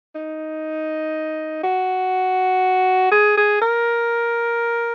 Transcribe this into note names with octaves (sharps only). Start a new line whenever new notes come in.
D#4
F#4
G#4
G#4
A#4